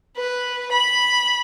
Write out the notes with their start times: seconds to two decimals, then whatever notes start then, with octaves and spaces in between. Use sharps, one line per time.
0.17 B4
0.71 B5